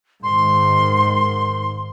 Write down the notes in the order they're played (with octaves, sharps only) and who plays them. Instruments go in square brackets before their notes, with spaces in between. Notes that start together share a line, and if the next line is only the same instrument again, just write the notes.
[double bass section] G#2 D#3 [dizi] C6